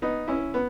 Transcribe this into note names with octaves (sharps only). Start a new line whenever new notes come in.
B3 D#4
C#4 E4
B3